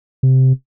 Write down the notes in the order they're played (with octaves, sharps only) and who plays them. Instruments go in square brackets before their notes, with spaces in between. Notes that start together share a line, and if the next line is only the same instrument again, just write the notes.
[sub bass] C3